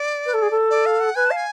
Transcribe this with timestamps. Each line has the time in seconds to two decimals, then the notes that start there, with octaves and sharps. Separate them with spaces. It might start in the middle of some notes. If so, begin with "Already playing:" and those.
Already playing: D5
0.25 B4
0.33 A4
0.42 G#4
0.50 A4
0.70 D5
0.86 F5
1.00 F#5
1.15 B4 G#5
1.26 F5 A5
1.36 G#5